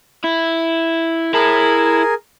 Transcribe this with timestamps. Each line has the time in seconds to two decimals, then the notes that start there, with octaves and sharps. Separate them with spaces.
0.24 E4
1.33 E4 G#4 A#4 A5